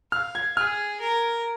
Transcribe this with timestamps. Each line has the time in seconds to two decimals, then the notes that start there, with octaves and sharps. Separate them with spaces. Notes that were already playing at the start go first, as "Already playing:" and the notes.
0.12 F5 F6
0.35 G#6
0.57 G#4 F6
1.00 A#4